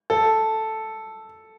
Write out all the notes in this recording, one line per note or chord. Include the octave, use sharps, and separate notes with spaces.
A4